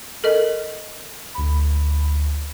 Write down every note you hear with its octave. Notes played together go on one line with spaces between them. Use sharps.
A4 A#4 D#5
D2 B5